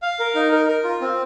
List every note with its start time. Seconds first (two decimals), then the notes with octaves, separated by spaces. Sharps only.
0.02 F5
0.19 A#4
0.35 D#4
0.52 A#4
0.69 A#4
0.84 F4
1.01 C4